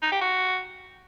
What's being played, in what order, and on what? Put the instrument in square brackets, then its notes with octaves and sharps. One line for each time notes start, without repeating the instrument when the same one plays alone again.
[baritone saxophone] D#4
G4
F#4